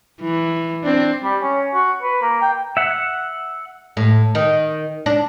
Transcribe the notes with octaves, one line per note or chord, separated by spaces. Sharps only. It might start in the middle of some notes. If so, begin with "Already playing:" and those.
E3
C4 D4
G3
C#4
F#4
B4
A#3
G5
E5 F#5
A2
D#3
D4